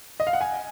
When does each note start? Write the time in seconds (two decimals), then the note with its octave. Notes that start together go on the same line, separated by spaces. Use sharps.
0.20 D#5
0.27 F5
0.33 F#5
0.41 G#5